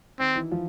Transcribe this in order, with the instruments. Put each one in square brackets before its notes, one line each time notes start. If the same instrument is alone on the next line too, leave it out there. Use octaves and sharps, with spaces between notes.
[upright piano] D#3 D#4 [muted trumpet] C4
[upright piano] E3 E4
F3 F4